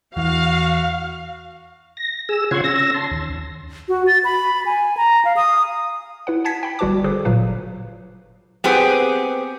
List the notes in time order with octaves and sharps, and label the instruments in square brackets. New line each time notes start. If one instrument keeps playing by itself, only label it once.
[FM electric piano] E2 E3 [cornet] F#4 [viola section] F5
[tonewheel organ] A#6
G#4 E6
C#3 F4 C#5 F#5 C6 G#6
C#4 E6 A#6
A5 C6
D#2
[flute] F#4
A6
B5
G#5
A#5
F5
D#6
[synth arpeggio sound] E4 B4 F#5
F#5 G#5 A5 G#6 B6 C#7
G5 B5
G1 G3 F#4 B4 A5 D6
D3 G#4 A4 B4 C5
G1 A#2 F#3 B4 F5
[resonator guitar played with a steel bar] B3 C4 G4 G#4